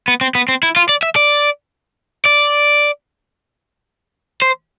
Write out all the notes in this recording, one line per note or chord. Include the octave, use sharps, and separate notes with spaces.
B3
C4
B3
C4
E4
F4
D5
E5
D5
D5
C5